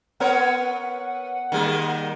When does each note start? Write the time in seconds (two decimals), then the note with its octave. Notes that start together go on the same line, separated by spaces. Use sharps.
0.20 B3 A#4 C#5 F#5
1.52 D#3 G3 A#3